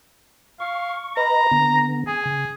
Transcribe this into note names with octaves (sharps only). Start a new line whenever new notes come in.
F5 C#6
B4 D#5 A#5 B5
D3 B3
G#4 G#5
C#3